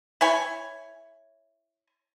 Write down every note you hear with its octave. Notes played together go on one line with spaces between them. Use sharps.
E4 C#5 G#5